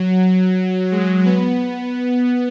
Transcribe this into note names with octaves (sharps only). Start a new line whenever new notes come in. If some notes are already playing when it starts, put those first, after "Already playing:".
Already playing: F#3
G#3
B3